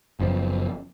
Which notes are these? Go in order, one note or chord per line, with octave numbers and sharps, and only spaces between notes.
F#1 F#2 F3 B3